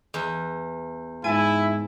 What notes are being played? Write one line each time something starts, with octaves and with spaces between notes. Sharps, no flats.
E2
G#2 E4 G#5 A5